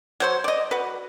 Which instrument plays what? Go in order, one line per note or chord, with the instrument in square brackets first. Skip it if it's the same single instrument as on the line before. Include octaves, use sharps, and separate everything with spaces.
[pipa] F#3 C5 C#5
D5 D#5
F#4 B4